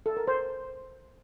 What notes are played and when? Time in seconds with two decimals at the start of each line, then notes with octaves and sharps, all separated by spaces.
0.06 A4
0.17 A#4
0.28 C5